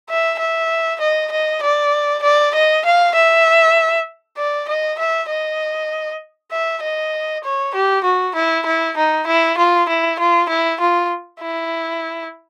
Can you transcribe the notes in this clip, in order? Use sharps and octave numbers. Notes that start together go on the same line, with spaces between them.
E5
E5
D#5
D#5
D5
D5
D#5
F5
E5
D5
D#5
E5
D#5
E5
D#5
C#5
G4
F#4
E4
E4
D#4
E4
F4
E4
F4
E4
F4
E4